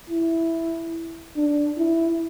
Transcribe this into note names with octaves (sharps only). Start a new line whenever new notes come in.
E4
D4
E4